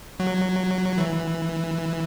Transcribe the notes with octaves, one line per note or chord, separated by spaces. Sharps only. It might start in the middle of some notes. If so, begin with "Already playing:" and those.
F#3
E3